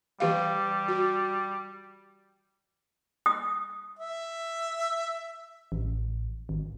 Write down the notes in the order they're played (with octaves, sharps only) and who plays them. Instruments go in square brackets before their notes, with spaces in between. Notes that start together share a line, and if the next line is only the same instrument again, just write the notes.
[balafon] E3 G4 F5 [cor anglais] G3
[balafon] F#4
[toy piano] D#6
[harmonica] E5
[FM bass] A1
G#1